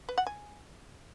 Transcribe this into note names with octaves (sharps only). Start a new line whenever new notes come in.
B4
F#5
G#5